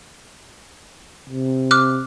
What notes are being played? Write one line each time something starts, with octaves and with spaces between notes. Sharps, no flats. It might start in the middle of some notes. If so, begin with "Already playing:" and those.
C3
D6 F6 F#6